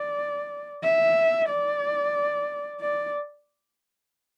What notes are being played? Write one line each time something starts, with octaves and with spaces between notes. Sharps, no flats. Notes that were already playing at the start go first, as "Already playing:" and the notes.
Already playing: D5
E5
D5
D5